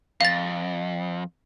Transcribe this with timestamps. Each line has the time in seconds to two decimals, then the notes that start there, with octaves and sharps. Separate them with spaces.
0.21 F2 F5 A6